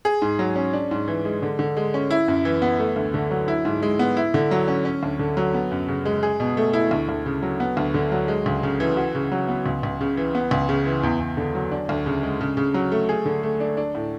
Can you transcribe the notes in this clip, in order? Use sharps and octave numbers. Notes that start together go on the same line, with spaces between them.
G#4
G#2
F#3
C#4
D4
G#2
E3
G#3
D3
D3
G#3
C#4
E4
F#2
E3
B3
A3
D2
D3
F#3
E4
G#2
G#3
B3
E4
D3
F#3
C#4
C#4
D2
D3
F#3
B3
F#2
C#3
G#3
G#4
B2
A3
E4
D2
D2
C#3
F#3
B3
D2
D3
F#3
G#3
C#2
C#3
E3
F#4
C#3
F#3
B3
C#2
C#2
C#3
E3
B3
C#2
C#3
E3
E2
E2
D3
F#3
D4
D2
C#3
G#3
C#3
C#3
F#3
A3
G#4
D3
A3
D4
D4
A2